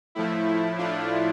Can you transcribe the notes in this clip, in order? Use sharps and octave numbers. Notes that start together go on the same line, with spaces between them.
A2 F3 A3 E4
E4
D4 F4